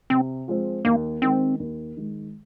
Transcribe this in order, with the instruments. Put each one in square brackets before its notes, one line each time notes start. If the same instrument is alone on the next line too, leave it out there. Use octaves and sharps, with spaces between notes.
[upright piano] C3 [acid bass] C4
[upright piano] F3 G#3 C4
[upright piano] D#2 [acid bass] A#3
[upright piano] D#3 G#3 [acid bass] C4
[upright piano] D#2
D#3 G#3